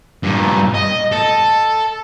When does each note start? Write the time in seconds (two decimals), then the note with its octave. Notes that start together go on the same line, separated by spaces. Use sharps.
0.23 G2 A#2
0.74 D#5
1.12 A4